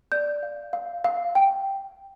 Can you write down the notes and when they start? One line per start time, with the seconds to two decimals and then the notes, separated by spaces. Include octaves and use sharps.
0.12 D5 G6
0.43 F5
0.73 F5
1.04 F5
1.35 G5